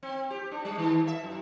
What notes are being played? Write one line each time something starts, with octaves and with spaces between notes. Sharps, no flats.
C4
G4
D4
G3
D#3
E5
F#2